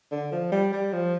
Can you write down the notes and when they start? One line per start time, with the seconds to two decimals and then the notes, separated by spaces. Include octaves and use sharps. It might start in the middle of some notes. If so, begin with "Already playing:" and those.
0.12 D3
0.32 F3
0.52 G3
0.73 G3
0.93 F3